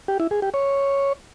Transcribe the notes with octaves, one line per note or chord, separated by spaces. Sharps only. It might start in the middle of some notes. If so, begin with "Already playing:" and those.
G4
E4
G#4
G4
C#5